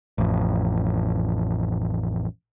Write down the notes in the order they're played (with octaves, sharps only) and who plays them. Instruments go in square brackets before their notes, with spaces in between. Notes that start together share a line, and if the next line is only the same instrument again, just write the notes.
[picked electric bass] A1 F2